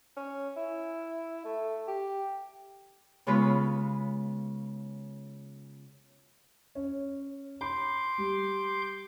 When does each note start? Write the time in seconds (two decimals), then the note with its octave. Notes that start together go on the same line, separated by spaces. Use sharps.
0.16 C#4
0.56 E4
1.44 A3
1.87 G4
3.27 C#3 G#3 B3 F4 B4
6.75 C#4
7.61 B5 C6 D6 G6
8.18 G3